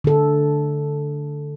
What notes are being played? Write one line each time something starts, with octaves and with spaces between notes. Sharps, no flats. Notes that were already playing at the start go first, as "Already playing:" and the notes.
D3 A4